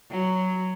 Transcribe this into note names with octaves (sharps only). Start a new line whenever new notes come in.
F#3